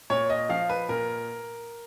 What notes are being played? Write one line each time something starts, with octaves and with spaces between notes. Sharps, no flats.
A#2 C#5
D#5
F3 F5
B4
A#2 A#4